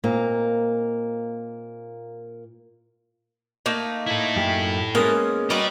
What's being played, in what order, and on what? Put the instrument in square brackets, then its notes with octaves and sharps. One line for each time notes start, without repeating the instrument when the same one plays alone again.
[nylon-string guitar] A#2 A#3 C4 D#4
[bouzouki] A3 A#3 D#4
[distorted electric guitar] E4 A4
[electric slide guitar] F#2 G4
[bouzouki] G#3 [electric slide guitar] A#3 B3 C#4 [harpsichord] A#4 D#6
[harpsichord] F#4 [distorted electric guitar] G4 D5 [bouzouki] A#4 B4 D#5